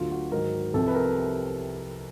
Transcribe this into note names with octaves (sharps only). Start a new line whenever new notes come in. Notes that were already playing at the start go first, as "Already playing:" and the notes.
Already playing: D2 D3 F#3 F4
F#4
G#2 D#3 F#3 A#4
C2 C3 F3 A4
B4
A#4